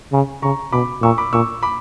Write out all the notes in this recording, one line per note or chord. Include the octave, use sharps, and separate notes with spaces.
C#3
C#3 A#5 C#6
B2 B5 D6
A#2 C#6 E6
B5 D6
A#2 C#6 E6
B5 D6